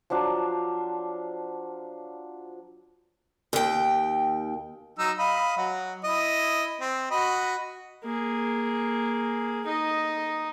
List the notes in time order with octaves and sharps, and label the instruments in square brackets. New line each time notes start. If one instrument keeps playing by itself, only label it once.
[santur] F3 F#3 D4 F5
[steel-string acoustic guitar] D#2 G5
[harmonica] F#3 D#4 E6
D#5 F5 B5
F#3 F#4
E4 D#5
C4
F#4 D#5 B5
[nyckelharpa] A#3 G#4
D#4 D#5